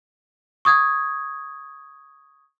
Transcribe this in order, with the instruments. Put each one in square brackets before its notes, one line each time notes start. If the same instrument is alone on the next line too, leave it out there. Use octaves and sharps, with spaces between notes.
[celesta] C#6 D#6 G#6